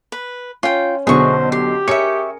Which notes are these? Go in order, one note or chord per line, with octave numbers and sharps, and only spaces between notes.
B4
C#4 F4 G5
B1 B2 D3 F#4 G#4 C5 E5 C#6
G4 C6
G#4 A#4 C#5 D#5 E5 C#7